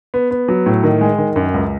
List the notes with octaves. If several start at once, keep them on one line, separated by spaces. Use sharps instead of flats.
B3
B3
F#3
A2
D#3
G#3
D#3
F#2
C#2